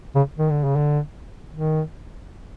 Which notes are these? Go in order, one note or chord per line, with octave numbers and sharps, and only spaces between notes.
C#3
D#3
D3
C#3
D3
D#3